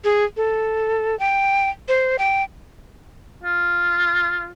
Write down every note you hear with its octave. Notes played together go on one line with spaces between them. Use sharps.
G#4
A4
G5
C5
G5
F4